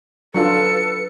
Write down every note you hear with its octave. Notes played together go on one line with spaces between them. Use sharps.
F#3 D4 F4 A4 B4 C#7